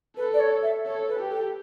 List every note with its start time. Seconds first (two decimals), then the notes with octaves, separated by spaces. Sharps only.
0.17 A4 B4
0.34 D5
0.40 C#5
0.63 E5
0.85 A4 C#5
1.08 B4
1.19 G4
1.31 A4